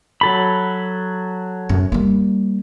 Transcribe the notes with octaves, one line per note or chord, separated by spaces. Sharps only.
F#3 A4 B5
F#2
G3 A#3